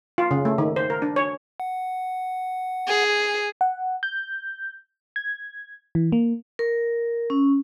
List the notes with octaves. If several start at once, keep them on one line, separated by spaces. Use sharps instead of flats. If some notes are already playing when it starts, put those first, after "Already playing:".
F4
C#3
A3
D#3
C5
A#4
D4
C#5
F#5
G#4
F#5
G6
G#6
E3
A#3
A#4
C#4